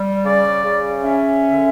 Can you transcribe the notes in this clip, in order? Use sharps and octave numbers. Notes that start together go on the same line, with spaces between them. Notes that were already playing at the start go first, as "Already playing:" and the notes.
Already playing: G3
C#3 D5
C#3
C#4 E5
D3